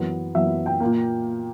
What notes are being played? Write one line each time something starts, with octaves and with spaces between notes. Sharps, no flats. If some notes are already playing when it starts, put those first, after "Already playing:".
Already playing: F#2 E3 B3
F#2 E3 B3 E5
G5
A#2 A#3